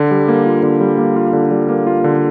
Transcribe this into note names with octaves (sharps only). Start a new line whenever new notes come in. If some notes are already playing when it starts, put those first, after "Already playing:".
Already playing: D3
G3
A#3
F4
D3
G3
A#3
F4
D3
G3
A#3
F4
D3